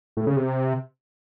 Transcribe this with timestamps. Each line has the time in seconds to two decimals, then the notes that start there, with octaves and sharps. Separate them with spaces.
0.17 A2
0.27 C#3
0.37 C3